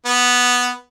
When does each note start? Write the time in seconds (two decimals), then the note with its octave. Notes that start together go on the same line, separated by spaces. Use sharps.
0.05 B3